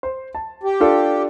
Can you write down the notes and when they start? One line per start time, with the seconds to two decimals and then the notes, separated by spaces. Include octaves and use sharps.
0.03 C5
0.35 A5
0.63 G4
0.80 D4 F4 A4